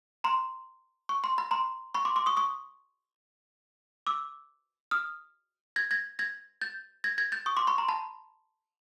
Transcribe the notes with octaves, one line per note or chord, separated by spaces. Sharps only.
A#5 C6
C#6
C6
B5
A#5 C6
B5 C#6
C6 D6
C6 D6
C#6 D#6
C#6 D#6
D6 E6
D#6 F6
G#6 A#6
G#6 A#6
G#6 A#6
G6 A6
G#6 A#6
G#6 A#6
G6 A6
C#6 D#6
C6 D6
B5 C#6
A#5 C6
A5 B5